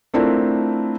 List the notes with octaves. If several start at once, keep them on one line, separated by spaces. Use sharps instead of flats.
A3 C4 D4 E4 F4 A#4